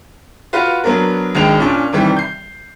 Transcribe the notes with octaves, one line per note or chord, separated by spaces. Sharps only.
F4 F#4 B4 F5 F#5
F#3 B3 D4 A#4
G#1 G#3 D4 G5 F7
A#2 C#4 D4
C3 D#3 E3 G3
G6 C7